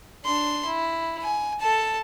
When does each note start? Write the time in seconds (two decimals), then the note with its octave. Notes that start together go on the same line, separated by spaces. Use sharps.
0.24 D4 C6
0.66 E4
1.22 G#5
1.60 A4 A5